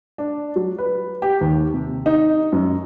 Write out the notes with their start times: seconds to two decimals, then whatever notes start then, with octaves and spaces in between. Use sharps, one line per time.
0.18 D4
0.56 F#3
0.78 B4
1.22 G4
1.41 D#2
1.74 C3
2.06 D#4
2.52 F#2